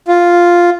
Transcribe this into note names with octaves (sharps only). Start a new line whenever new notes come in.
F4